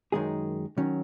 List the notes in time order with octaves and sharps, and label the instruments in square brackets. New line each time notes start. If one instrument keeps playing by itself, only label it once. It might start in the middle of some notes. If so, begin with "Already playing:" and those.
[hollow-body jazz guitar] F#2 D#3 G#3 D#4 G#4
D#3 F#3 C#4